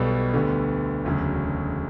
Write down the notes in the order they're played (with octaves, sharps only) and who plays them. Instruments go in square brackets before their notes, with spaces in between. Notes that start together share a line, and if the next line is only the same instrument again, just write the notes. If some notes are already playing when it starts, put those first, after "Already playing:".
Already playing: [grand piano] B1 B2 G3 B3 A4
D2 D3 G3 B3
E1 D2 C#3 F#3